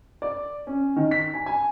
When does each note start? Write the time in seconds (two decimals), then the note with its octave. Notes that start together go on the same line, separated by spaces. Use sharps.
0.22 D5
0.67 C#4
0.96 D#3
1.11 B6
1.34 G#5
1.46 G#5